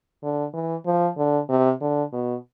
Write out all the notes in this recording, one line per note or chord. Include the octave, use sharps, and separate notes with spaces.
D3
E3
F3
D3
C3
D3
B2